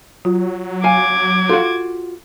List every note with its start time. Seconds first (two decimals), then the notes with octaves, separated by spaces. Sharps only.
0.25 F#3 F4
0.84 F5 G#5 D6 G#6
1.49 F4 F#4 A4 F5